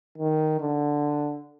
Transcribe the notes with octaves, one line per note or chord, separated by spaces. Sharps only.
D#3
D3